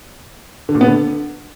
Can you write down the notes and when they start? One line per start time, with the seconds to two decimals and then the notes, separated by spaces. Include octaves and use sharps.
0.69 D3
0.75 A#2
0.81 B3
0.87 D3